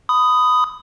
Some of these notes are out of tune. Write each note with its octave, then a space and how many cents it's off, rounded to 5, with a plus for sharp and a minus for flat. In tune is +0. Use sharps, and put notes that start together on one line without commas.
B5 +20 D#6 +0